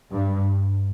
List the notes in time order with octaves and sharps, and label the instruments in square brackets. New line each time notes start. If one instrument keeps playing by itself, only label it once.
[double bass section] G2